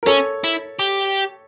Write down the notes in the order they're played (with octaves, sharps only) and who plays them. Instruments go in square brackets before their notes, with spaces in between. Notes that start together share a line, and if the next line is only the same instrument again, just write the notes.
[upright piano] A#4
[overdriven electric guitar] C#4 [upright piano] A4 C#5
[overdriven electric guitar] E4
G4